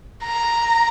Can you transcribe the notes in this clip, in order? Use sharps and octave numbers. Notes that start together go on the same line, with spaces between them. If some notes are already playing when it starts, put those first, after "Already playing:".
A#5